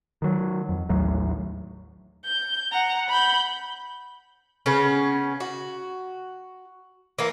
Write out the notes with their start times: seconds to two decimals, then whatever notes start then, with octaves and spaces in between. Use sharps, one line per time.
0.22 D#3 F#3
0.69 F2
0.89 A1 D#2 F#3 A3
2.25 G6
2.72 F#5 A#5
3.09 B5 G6
4.66 C#3 B3 C#4
5.40 F#4
7.19 E3 A#3